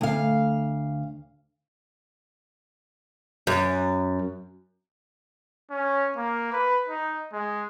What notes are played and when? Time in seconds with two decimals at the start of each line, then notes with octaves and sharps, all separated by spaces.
0.01 D2 F5
3.47 F#2
5.70 C#4
6.17 A#3
6.52 B4
6.88 D#4
7.33 G#3